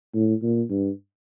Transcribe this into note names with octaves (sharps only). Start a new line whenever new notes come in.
A2
A#2
G2